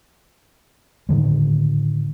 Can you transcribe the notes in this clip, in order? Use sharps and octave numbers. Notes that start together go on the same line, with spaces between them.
A2 D3 D#3 G#3